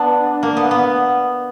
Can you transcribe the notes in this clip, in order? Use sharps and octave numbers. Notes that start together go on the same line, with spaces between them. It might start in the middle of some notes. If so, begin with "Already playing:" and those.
Already playing: B3 D4
A#3
B3
B3